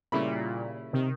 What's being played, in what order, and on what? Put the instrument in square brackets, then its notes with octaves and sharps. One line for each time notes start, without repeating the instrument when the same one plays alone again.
[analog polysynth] A#2 G3 [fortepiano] C#3 E4 B5
[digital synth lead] C3 [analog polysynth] D#3